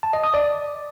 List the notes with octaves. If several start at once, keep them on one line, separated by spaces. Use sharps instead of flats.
A5
D#5
D#6
D5